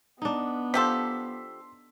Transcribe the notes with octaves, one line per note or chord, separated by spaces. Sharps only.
B3 D4 D#4
F3 G4 A4 C6 E6 B6